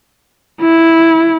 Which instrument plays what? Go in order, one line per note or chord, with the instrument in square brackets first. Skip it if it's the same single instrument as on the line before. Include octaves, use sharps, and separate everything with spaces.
[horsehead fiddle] E4